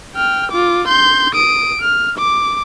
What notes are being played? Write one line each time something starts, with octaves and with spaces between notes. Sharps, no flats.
G5 F6
F4 D6
C6 G6
D#6 D7
F6
D6